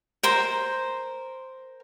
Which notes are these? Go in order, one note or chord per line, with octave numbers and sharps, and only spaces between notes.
A#4 C5